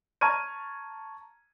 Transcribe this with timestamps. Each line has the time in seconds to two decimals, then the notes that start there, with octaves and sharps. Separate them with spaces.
0.21 A5 A#5 C#6 F6 G#6 D#7